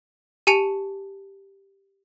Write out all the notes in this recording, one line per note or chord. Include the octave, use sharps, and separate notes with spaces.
G4 G#5 A5 C#7 D#7 F7